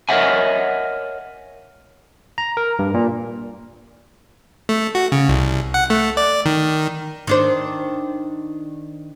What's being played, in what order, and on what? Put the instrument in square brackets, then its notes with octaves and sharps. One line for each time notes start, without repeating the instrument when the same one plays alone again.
[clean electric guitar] A#4 C#5 D#5 E5 F#5 G#5
[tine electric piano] A#5
A#4
G2
A#2
[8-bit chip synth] A3
F#4
C#3
C2
F#5
A3
D5
D#3
[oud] D#3 D4 C5